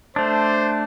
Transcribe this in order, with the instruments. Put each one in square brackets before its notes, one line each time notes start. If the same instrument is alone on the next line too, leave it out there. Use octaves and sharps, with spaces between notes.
[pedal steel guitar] A3 D4 [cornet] C5